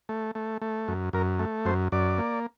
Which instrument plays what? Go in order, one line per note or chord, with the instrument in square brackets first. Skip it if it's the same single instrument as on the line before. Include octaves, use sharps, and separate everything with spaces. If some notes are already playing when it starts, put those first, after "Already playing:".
[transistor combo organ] A3
A3
A3
F#2
F#2 A#4
A3
F#2 C5
F#2 D5
A#3